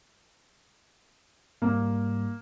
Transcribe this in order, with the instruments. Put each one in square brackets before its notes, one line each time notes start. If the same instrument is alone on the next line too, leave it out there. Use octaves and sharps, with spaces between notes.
[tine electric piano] G#2 G3 [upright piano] A#3